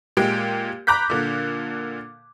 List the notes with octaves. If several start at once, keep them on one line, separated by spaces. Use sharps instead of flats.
A#2 G#3 G4 D7
A#5 B5 D6 F#6 G6 B6
A#2 D3